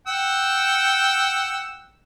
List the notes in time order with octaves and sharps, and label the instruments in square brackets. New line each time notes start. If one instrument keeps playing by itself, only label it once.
[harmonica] F#5 G5 E6